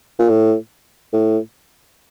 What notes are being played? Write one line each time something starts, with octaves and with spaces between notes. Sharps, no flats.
A#2
A2
A2